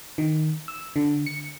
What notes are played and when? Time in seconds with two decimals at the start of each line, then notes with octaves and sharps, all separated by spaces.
0.18 D#3
0.68 E6
0.96 D3
1.26 C#7